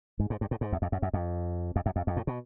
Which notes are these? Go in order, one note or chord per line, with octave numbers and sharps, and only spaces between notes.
G#2
G#2
G2
A2
G#2
E2
F2
F#2
F#2
F2
F2
F#2
F2
F2
A2
B2